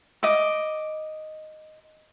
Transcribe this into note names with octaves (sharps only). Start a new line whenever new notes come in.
D#5 D6